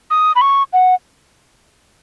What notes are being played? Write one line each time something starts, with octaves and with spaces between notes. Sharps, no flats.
D#6
B5
C#6
F#5